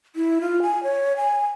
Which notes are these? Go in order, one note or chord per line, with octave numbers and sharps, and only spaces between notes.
E4
F4
G#5
C#5
G#5